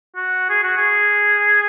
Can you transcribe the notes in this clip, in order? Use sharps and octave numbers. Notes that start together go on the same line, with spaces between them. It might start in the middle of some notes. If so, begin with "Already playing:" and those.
F#4
G#4
F#4
G#4